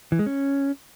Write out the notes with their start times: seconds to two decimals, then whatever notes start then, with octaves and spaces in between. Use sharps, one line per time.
0.12 E3
0.19 G#3
0.26 C#4